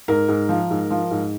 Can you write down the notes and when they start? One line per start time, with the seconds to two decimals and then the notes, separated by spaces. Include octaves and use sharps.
0.08 G#2 A#4
0.28 G#2
0.49 F3
0.70 G#2
0.90 F3
1.11 G#2